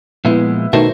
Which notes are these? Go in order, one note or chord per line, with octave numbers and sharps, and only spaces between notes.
A#2 F3 G#3 B3 E4
B2 D#3 A3 D#4 F#4 C5 E5